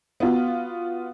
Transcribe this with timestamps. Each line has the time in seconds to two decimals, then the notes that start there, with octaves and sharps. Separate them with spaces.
0.20 B3 F4 F#4